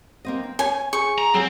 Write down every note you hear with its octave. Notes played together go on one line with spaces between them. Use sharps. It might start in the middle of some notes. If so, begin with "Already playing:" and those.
A#3 C4 D#5
C4
C#5 G#5
G#4 C#6
A#5
F#3 C4 F4 G#4